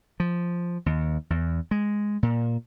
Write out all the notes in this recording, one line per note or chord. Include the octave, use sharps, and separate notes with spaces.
F3
D#2
E2
G#3
A#2